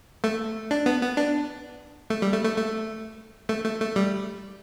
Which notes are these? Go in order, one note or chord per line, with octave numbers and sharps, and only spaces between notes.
A3
D4
B3
B3
D4
A3
G3
A3
A3
A3
A3
A3
A3
G3